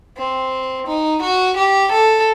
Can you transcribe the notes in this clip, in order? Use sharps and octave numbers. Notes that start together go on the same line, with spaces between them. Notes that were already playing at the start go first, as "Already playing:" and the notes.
C4
D#4
F#4
G4
A4